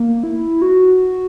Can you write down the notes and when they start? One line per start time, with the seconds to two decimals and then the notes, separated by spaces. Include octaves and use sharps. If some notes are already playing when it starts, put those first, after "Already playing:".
Already playing: A#3
0.24 E4
0.62 F#4